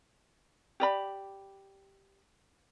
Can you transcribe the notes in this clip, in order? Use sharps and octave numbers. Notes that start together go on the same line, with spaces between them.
G4 D5 B5